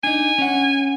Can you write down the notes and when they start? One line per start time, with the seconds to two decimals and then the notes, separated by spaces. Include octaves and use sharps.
0.04 D4 D#4 G#5
0.38 C#4 F#5